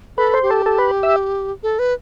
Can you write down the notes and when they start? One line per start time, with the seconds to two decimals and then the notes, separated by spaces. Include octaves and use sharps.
0.17 A4 B4
0.34 C5
0.43 G4
0.50 A4
0.66 A4
0.78 B4
1.03 E5
1.63 A4
1.79 B4